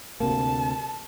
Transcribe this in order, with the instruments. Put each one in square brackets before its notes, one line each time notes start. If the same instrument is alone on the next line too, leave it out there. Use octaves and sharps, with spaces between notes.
[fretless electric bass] D2 C3 A#3 [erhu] A5